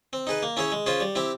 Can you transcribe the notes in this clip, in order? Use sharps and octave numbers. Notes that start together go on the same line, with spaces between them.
C4
D#4 G#4 B4
A#3
C#4 E4 G#4 C#5
G#3
C#4 F4 G#4 C5
G3
C4 E4 G4